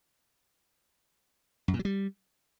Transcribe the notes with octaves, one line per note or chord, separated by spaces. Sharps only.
F#2
A#2
F#3
G3